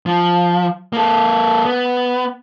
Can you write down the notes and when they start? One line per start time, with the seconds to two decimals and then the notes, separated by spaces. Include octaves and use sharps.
0.06 F3
0.93 A#3 A4
1.65 B3